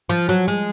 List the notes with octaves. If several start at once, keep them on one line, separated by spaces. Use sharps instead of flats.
F3
F#3
G#3